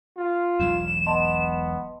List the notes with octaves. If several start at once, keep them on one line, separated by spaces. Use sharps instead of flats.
F4
E1 B1 E2 E7
B3 D#5 A5 C6